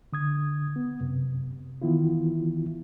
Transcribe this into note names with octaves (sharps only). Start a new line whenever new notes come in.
D3 D#6 G#6
B3
F#2 C3
D#3 E3 B3 E4 F4